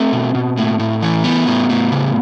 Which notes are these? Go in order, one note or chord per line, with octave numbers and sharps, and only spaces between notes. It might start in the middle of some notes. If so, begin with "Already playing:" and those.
Already playing: A3 C4
B2
B2
A2
A2
E3
A3 B3
A2
A2
C#3